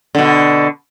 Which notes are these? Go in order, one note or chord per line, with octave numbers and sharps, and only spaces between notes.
B2 D3